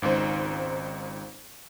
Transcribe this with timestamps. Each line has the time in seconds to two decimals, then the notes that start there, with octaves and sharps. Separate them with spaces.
0.02 G#1 C#2 D#4 C5